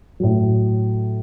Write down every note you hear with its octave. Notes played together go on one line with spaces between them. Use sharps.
A2 F#3